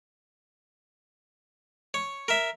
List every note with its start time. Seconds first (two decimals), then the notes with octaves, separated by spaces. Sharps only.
1.94 C#5
2.28 A#4 E5